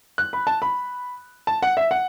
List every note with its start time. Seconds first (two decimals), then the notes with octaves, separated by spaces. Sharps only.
0.18 F#6
0.33 B5
0.47 A5
0.62 B5
1.47 A5
1.63 F#5
1.77 E5
1.91 F#5